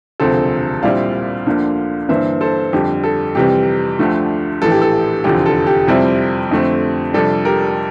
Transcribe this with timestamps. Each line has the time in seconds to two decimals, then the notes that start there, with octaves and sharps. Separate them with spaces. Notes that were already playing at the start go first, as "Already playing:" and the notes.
0.20 E1 D2 C3 F3 C4 A4 C5
0.83 A#1 A#2 G3 C4 E4 D5 F5
1.46 D2 D3 F3 A#3
2.09 G1 G2 E3 A#3 C5 E5
2.41 A4 C5
2.73 F2 D3 G3 G4
3.04 A4
3.35 F2 C3 E3 G3 G4
3.99 D2 D3 F3 A3
4.62 A#1 A2 E3 A4
4.71 G4
4.82 A4
5.24 F1 E2 D3 F3 G4
5.46 A4
5.67 G4
5.87 F2 C3 G3 C4 E4
6.51 F2 D3 A3 C4
7.13 F2 C3 G3 D4 A4
7.45 G4 A#4